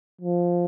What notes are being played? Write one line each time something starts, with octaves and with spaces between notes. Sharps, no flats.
F3